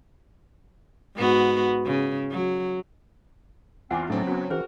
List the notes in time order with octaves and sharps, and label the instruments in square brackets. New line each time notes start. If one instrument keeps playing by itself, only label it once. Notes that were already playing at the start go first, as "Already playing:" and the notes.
[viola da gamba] G#2 B3 F#4
C#3
F#3
[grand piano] E2 [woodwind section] C4 [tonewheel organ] F4 [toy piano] F#5 G#5 D6
[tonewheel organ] A2 A3 D4 [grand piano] C#3 C4 [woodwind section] F#3
[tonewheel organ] B3 C#4 [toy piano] F#4
[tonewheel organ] E3 [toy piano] C#4 G#4 C5 [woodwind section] F#4 A#4